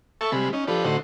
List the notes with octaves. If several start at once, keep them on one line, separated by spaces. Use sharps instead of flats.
A4 E5 A5 C#6
C3 G3 G#3 B5
C#4 D#4
F3 D4 G4 A4 B4
A2 D3 D#4 F#4 A4 C5